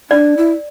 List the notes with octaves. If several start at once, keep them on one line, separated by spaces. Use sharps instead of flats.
D4 D5
E4